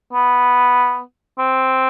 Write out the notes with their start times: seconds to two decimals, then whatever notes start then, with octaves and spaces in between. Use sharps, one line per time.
0.13 B3
1.39 C4